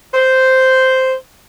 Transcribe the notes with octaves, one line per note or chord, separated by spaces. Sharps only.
C5